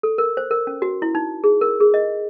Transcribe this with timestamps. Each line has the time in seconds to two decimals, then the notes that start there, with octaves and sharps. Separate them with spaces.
0.03 A4
0.18 A#4
0.37 C5
0.51 A#4
0.67 C#4
0.82 F#4
1.02 E4
1.15 D#4
1.44 G#4
1.61 A#4
1.80 G#4
1.94 D#5